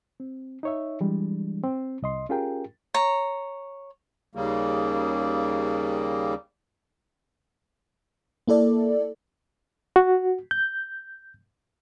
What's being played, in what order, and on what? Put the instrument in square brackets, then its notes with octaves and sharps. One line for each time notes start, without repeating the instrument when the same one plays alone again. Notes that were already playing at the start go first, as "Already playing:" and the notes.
[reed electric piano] C4
D#4 C#5 E5
E3 G3 G#3 D4
C4
C2 D#5 C6
C#4 F4 G4 G#4 A#4 G5
[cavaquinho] C#5 A#5
[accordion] D#2 C#3 G3 A#3
[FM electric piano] A#3 E4 A4 D5
[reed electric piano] F#4
G6